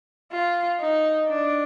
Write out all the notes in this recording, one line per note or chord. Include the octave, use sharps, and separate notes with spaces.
F4
D#4
D4